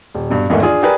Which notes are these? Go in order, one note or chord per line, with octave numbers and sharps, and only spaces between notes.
D#1
G2 B2
E2 G#2 D#3 E3 A3 D4
D4 F4 G#4
G4 G#4 A#4 B4 D5